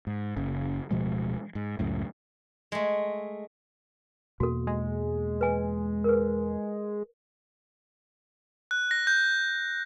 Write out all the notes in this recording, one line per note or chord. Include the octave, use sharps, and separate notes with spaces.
G#2
F#1 C#3
D1 B2 F3 G#3
G#2
C#2 F#2 A2
G#3 A3
E2 B2 A#3 F#4 A4
G#3
B4 G#5
A#4 B4
F#6
A#6
G6